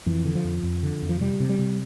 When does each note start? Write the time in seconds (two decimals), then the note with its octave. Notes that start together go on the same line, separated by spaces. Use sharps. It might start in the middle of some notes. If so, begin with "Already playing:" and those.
0.06 F2 E3
0.25 D3
0.35 F3
0.44 F2
0.63 F2
0.83 D3
1.02 F2
1.09 F3
1.20 C3 G3
1.40 C3
1.49 G3
1.59 C3